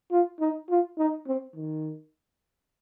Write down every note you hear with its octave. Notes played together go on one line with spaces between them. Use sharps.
F4
D#4
F4
D#4
C4
D#3